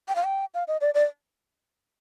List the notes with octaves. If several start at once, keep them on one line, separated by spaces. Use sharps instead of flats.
G5
F5
G5
F5
D#5
D5
D5